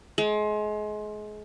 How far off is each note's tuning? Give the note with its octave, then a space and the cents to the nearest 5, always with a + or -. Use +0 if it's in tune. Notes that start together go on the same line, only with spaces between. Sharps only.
G#3 +30